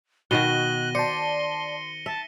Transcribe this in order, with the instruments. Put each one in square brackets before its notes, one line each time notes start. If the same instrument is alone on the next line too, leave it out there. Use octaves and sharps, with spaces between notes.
[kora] B2 D#3 F#4 [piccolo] F#6 [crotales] A#6 D#7 G7
[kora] C5 [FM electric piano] D5 A5 [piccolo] C6 [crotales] C#7
[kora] E5 [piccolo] A5